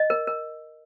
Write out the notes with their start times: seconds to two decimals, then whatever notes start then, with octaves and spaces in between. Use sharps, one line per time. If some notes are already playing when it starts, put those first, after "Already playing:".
Already playing: D#5
0.10 A#4
0.27 A#4